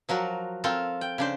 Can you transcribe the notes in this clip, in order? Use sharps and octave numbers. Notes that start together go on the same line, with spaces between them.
F3 F#3 F#4 A#4
C4 F4 A4 A#4
G5
C#3 D4 C5